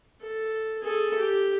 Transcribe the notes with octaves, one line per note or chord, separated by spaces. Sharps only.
A4
G#4 A4
G4